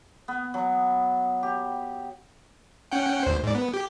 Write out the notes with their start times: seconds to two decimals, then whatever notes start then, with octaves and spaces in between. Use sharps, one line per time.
0.28 B3
0.54 F#3
1.43 G4
2.92 C#4 F#5 G5
3.23 D2 C5
3.43 G#2 D5
3.55 B3
3.74 G4